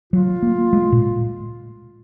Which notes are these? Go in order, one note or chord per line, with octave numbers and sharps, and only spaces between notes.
F#3 F4
A#3
G#3
A#2